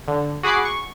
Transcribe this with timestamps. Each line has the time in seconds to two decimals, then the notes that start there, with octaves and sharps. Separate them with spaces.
0.08 D3
0.43 F#4 G#4 F#5 B5 D6 C7
0.65 C#6